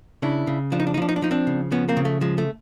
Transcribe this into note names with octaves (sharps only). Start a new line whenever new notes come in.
C#3 D4 E4
C#3
F3 D4
D#4
D4
D#4
F3 D4
D#4
D4
F3 D#4
C4 D4
C#3
F3 B3 C#4
A#3 C4
C#3
A3
F3 G#3
A3